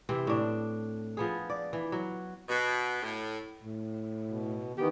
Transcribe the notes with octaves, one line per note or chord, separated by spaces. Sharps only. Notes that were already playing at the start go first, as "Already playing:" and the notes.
C3 E3 C4
A2 D4
F3 B3 G#4
D5
E3
F#3
B2
A2
A2
B2
D#3 E3 B3 G4